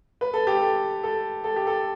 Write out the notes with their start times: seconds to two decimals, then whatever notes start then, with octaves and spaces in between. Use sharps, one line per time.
0.21 B4
0.33 A4
0.47 G4
0.59 A4
1.03 A4
1.44 A4
1.56 G4
1.67 A4